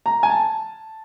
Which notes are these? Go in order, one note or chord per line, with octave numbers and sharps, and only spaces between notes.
A#5
G#5
A5